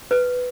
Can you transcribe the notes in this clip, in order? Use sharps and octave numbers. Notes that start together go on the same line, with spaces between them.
B4